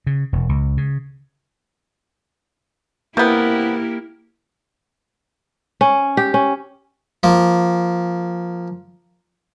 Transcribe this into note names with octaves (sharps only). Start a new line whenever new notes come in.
C#3
E1
C#2
C#3
C3 A#3 B3 E4 G4 A#4
C#4
G4
C#4
F3 A#3